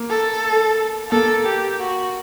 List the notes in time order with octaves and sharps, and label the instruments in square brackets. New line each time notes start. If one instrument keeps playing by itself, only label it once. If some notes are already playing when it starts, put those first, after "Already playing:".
Already playing: [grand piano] A#3
[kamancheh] A4
[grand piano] A#3 [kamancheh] A4
[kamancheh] G4
F#4